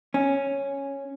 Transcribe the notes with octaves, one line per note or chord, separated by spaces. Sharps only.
C#4